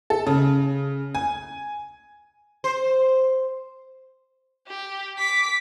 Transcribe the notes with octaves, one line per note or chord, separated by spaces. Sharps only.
A4
C#3
G#5
C5
G4
D6 B6